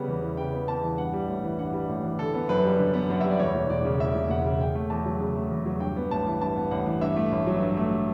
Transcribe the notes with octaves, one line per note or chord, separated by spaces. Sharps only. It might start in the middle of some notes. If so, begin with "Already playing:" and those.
Already playing: C#3 G3 B3
E2
E3
C#3 G5
B3
E2 A5
E3
G2 F#5
G3
A1
E3
G2 F#5
G3
A1
E3
D3 A4
B3
F#2 B4
G3
D3
B3
F#2 F#5
G3 E5
D5
E2 C#5
E1
E1 D5
C#3
E2 E5
E1
E1 F#5
C#3
C#3 G5
A3
E2 A5
F#3
C#3
A3
E2
F#3
G2 G5
B3
A1 A5
E3
G2 A5
B3
A1 F#5
E3
G2 E5
A3
A1
F#3
G2
A3